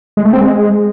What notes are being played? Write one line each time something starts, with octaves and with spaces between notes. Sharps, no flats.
G#3
A3
C4
G#3